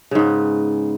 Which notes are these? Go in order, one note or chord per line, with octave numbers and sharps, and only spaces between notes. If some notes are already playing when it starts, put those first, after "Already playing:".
G#2 C#3 B3